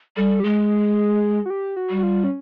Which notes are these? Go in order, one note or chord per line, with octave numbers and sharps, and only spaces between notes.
G3 A4
G4
G#3 G#4
F#4
G4
F#4
G3
F#4
F4
C#4